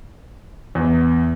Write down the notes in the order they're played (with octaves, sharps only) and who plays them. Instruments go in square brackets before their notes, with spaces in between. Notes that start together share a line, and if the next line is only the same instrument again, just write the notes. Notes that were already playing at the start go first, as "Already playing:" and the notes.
[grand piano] E2